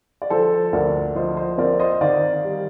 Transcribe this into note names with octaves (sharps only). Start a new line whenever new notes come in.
D5
F3 A4 C5
D2 A#4 D5
F3 C5 D#5
C5 D#5
C4 A#4 D5
C5 D#5
D#3 D5 F5
G3